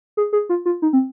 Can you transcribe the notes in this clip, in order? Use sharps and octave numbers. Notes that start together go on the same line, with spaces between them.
G#4
G#4
F4
F4
D#4
C4